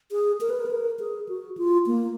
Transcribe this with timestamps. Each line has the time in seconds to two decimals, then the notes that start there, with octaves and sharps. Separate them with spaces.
0.12 G#4
0.41 A#4
0.50 B4
0.60 A#4
0.66 B4
0.71 A#4
1.00 G#4
1.29 F#4
1.57 F4
1.87 A#3